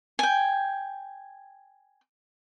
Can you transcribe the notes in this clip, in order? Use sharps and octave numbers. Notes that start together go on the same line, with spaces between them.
G5 G#5